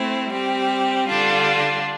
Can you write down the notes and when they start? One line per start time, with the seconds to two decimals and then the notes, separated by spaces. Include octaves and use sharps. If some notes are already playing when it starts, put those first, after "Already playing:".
Already playing: A3 C4 E4
0.31 G3 C4 G4
1.06 D3 G3 D4 F4